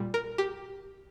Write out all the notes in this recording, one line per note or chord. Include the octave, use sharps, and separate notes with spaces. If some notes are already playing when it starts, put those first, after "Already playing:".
Already playing: A#2 G3
A#4
G4